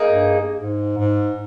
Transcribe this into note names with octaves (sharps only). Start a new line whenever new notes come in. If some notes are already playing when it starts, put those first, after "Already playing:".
Already playing: A#3 D#4 G#4
G2
G#2
G#2